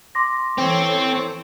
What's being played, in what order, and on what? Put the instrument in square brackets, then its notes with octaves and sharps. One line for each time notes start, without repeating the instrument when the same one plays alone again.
[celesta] C6 D6 A#6
[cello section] E3 A4 C#5 [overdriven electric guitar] C4